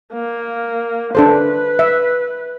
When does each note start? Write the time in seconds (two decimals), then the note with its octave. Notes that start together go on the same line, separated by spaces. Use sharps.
0.13 A#3
1.15 D4 A4 B4 C5
1.79 E5